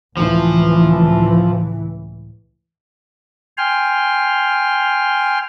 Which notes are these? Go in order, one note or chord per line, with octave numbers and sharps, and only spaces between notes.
C#2 A2 E3 F3
G5 G#5 C6 F6